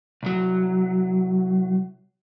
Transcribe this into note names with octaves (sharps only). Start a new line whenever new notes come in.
C2 F#3